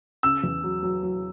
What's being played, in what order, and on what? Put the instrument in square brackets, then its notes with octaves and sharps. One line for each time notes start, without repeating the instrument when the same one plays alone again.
[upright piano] C#3 [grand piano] E6
[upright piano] E2
F#3
F#3
F#3